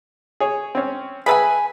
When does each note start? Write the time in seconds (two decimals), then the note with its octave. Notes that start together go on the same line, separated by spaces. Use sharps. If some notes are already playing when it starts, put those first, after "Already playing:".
0.40 G#4 C#5
0.75 C4 C#4
1.26 G#4 B4 E5 G#5 A5 B5